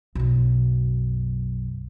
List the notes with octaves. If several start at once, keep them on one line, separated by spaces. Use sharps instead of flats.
B1 F#2